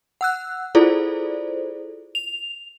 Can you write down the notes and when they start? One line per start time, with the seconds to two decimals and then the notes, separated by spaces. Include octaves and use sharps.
0.21 F#5 E6 F#6
0.75 E4 F4 G#4 A4 C5 D5
2.15 F7